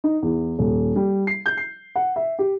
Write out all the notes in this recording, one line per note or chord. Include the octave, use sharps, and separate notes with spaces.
D#4
E2
D#1
G3
C7
G6
C7
F#5
E5
G4